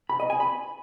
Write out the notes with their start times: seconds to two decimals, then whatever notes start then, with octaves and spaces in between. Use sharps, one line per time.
0.10 B5
0.20 D#5
0.30 G#5
0.40 B5